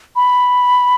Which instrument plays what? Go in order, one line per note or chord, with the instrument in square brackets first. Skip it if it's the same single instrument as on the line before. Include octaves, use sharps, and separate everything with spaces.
[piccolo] B5